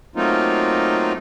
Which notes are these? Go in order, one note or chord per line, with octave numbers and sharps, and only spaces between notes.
F#3 A3 A#3 C4 D#4 F4